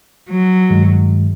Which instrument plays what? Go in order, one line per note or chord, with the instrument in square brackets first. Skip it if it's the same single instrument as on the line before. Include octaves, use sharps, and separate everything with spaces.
[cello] F#3
[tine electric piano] G2 D#3 G#3